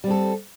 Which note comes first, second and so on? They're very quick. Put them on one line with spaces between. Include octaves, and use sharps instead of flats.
G3 C4 A4